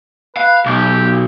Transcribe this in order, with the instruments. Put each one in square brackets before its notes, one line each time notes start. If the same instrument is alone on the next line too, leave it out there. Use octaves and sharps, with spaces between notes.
[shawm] B4 [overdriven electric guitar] F5
[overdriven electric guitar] B1 [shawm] G4